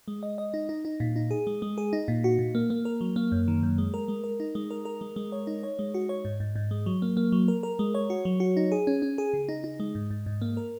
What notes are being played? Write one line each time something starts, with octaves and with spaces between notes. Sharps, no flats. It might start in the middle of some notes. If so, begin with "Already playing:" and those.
G#3
D#5
D#5
D#4
D#4
D#4
A#2
D#4
G#4
G#3
G#3
G#4
D#4
A#2
F#4
A#2
A#3
A#3
A#4
F#3
A#3
F#2
D#3
F#2
G#3
A#4
G#3
A#4
D#4
G#3
A#4
A#4
G#3
G#3
C#5
D#4
C#5
G#3
F#4
C#5
G#2
G#2
G#2
G#3
F#3
A#3
A#3
F#3
A#4
A#4
G#3
C#5
F#4
F#3
F#4
D#4
G#4
C#4
C#4
G#4
C#3
D#4
D#4
G#3
G#2
G#2
G#2
A#3
A#4